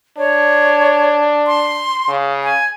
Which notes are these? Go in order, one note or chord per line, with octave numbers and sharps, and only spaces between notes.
D4 C#5
C6
C#3
G#5